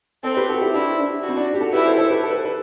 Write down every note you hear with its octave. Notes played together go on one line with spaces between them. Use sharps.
C4 A4 C5
G4 B4
F#4 A4
E4 G4
D4 E4
D4
F#4
C4
D4
G4
F#4 A4
E4 G4 B4
A4 C5
A4 C5
G4 B4
A4
B4
A4
B4